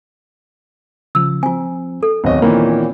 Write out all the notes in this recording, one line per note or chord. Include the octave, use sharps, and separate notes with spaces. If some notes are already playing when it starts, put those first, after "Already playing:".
C#3 F3 E6
F3 C4 F4 G#5
A4
D1 D#2 B3 C4 C#5 D#5
A#2 D#3 E3 A#3 B5